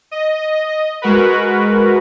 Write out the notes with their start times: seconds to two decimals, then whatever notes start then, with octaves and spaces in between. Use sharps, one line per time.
0.11 D#5
1.02 G#3 F#4 A#4 B4